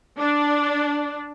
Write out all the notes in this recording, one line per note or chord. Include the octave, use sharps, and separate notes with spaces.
D4